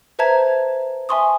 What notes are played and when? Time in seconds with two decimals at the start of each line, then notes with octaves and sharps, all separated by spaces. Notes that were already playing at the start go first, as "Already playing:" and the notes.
0.19 B4 C5 E5 A5 A#5 G#6
1.09 E5 G#5 A5 C6 C#6 D#6